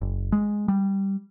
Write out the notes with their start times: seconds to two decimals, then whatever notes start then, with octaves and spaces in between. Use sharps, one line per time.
0.02 F#1
0.32 G#3
0.68 G3